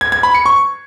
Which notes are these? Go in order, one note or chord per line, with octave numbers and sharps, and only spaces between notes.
G#6
G#6
B5
C#7
C#6